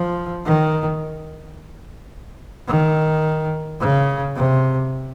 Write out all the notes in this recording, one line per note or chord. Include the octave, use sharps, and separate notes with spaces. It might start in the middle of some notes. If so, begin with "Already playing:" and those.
Already playing: F3
D#3
D#3
C#3
C3